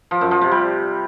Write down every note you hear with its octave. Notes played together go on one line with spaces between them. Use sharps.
F3
F#2
F3
C3
G3